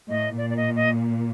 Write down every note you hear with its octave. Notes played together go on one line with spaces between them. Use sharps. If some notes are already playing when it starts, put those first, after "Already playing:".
A2 D#5
A#2 D5
D5
D#5
D#5